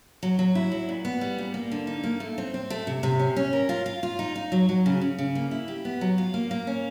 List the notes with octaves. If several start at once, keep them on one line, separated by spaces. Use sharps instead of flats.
F#3
F#3
E4
F#3
A#2
B3
G3
A#2
A#3
D3
D#4
A#3
A3
C4
C4
A3
C3
C3
C#4
C#4
A#4
F4
F4
F4
D#4
D#4
F#3
F#3
C#3
C#3
C#3
A#3
E4
G4
B3
F#3
F4
A#3
A#3
C#4